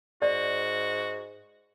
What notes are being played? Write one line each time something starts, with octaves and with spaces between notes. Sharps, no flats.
G#2 F#4 D5